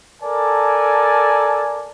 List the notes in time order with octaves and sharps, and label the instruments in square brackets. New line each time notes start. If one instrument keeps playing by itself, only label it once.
[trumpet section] A4 A#4 D5 G#5 A5